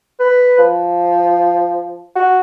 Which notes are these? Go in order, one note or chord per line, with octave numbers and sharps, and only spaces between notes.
B4
F3
F#4